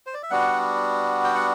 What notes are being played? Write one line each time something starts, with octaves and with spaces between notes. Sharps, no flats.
C5
D5
E5
G3 B3 D4 F#4 F#5
G5
F#5